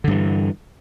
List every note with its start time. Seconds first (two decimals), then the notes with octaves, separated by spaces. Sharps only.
0.04 D3
0.08 G2
0.11 E3